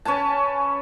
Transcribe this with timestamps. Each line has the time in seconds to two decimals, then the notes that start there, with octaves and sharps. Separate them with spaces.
0.05 C#4 B4 G#5 A5